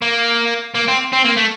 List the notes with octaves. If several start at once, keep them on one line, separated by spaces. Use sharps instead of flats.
A#3
A#3
C4
C4
A#3
A3